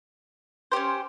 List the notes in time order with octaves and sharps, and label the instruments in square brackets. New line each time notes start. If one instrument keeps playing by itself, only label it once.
[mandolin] C#4 G4 C5